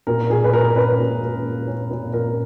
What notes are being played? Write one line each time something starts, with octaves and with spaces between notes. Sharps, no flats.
A#2 A#4
A#2 G#4
B4
A#3 A#4
C#4 B4
A#2
A#2
A#3
C#4
A#2
A#2 A#4